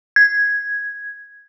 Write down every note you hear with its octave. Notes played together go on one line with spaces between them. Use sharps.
G#6